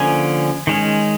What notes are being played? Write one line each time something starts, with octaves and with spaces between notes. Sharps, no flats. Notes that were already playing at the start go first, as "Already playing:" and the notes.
Already playing: D3 F3 A#3 C#4 G#5
D#3 G#3 C#4